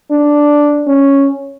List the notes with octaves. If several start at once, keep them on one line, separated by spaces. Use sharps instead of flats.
D4
C#4